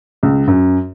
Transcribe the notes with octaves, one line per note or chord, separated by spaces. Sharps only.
C#2
F#2